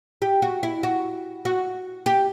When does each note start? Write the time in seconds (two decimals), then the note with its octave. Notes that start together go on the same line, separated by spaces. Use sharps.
0.22 G4
0.42 F#4
0.63 E4
0.83 F#4
1.45 F#4
2.06 G4